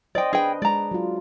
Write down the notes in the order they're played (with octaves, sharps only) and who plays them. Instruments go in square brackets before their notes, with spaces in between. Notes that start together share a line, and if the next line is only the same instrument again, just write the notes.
[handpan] C5 D#5 [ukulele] D5 G5
[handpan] D4 B4 [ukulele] G#4 G5
[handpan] G#3 [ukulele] D5 A#5
[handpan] F#3 F4